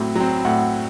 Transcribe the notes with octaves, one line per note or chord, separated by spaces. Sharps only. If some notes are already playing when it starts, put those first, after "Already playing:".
Already playing: A2 F#3 C4
F#3 C4
A2 F#5